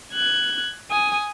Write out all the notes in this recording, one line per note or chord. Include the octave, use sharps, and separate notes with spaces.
F#6 G#6
G#5 D#6